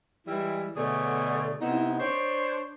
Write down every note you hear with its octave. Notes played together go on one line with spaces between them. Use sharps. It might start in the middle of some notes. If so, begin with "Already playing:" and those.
E3 G3 G#3 E4
B2 D3 A3 G#4 C#5 D5
C3 B3 C4 D#4 E4
D4 C5 C#5